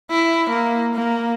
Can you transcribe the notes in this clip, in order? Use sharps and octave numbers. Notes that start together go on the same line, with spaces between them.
E4
A#3
A#3